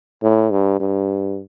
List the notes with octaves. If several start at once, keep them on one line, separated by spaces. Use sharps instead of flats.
A2
G2
G2